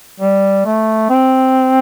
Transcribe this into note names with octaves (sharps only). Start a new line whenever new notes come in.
G3
A3
C4